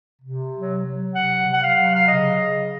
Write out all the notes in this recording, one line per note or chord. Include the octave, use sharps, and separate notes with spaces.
C3
F#3
F#3
C3 F#5
C3
F#5
F5
F#3
F5
C#3 D#5
C#3